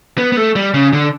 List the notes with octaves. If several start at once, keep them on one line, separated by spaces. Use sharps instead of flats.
B3
B3
A3
G3
C#3
D3